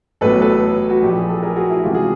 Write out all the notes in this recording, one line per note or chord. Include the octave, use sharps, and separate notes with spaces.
A1 A2 F#3 B3 A4 B4
A4 B4
F#4
A#1 A2 F3 G4
G#4
A4
G#4 A#4
F#4 G#4
E4 F#4
F#4
C#2 C3 E3 G#3 F4 G4
F#4 G#4